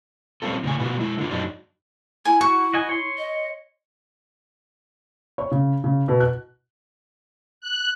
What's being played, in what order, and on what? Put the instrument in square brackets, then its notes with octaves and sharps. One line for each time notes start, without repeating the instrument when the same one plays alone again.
[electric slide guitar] G3 C4 C#4 F4 A4
A2 C#3 D5 G#5
B2 B3 C#4 F4 F#4
G#3 E4
D3 F4
F#2 F#3 D4 D#4
[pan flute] E4 [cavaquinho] G#5
[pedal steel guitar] F#4 [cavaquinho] C#6
[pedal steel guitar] F#4 D#5 G#5
C#5 C6
[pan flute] D#5
[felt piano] C#5
C#3
C#3
B2
F#6
[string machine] F#6